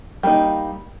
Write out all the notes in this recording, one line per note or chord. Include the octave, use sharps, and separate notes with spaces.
G3 A#3 D#4